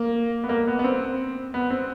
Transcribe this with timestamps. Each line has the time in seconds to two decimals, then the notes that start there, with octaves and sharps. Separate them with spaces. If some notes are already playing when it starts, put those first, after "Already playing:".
Already playing: A#3
0.44 B3
0.49 A#3
0.67 B3
0.79 B3
0.84 C4
1.54 B3
1.70 C4